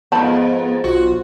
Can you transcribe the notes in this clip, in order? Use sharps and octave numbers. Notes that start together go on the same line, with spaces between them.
F2 G#2 F3 B3 A5 B5
B1 F4 F#4